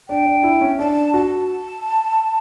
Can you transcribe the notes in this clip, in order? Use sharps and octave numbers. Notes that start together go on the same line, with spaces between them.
D4 G5
D4
E4
C#4
D4 A5
F#4 A5